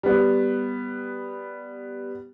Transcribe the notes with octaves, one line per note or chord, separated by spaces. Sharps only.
G3 B3